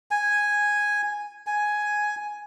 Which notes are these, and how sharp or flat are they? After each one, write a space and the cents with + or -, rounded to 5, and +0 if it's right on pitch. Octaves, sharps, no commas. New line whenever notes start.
G#5 -5
G#5 +5